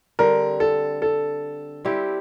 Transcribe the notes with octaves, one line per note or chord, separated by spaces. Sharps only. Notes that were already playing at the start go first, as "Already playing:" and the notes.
D3 G3 C4 A#4
A4
A4
G3 C4 E4 G4